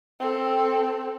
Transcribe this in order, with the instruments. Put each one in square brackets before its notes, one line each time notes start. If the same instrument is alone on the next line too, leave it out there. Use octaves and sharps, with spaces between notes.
[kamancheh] C4 A4